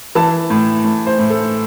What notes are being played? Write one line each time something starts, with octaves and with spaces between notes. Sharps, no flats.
E3 A5
A2
A2
C5
A2
A4